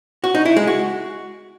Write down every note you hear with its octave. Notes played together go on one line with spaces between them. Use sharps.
F#4
D#4
E4
G#3
F#4